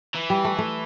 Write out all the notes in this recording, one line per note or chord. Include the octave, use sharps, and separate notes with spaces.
E3
G3
A3
A3